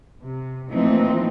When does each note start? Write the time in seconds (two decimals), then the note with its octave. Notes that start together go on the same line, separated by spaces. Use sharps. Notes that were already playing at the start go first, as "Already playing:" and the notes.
0.23 C3
0.72 A#2 E3 F3 A3 C4 D#4